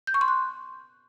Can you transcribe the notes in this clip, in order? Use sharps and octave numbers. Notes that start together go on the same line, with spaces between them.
G6
C#6
C6
F#6